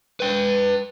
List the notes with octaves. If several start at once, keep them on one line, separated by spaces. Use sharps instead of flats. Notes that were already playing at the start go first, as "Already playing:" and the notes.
B4 G5